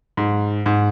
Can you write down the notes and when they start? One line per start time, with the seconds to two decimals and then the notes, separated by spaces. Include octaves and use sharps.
0.17 G#2
0.66 G#2